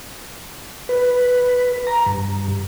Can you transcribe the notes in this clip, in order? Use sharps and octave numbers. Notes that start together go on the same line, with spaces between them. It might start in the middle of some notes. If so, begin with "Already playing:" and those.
B4
A#5
G2